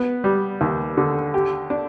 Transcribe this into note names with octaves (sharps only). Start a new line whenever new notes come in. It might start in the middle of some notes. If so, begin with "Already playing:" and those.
Already playing: B3
G3
D#2
D3
G4
D4